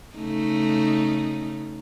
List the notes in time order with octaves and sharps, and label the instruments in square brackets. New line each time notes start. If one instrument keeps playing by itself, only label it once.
[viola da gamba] C#3 A3 D#4